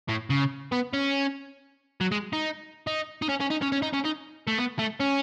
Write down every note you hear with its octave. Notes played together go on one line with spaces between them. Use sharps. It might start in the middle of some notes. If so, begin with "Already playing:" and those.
A2
C#3
B3
C#4
F#3
G#3
D#4
D#4
D#4
C#4
C#4
D#4
C#4
C#4
D#4
C#4
D#4
A3
B3
A3
C#4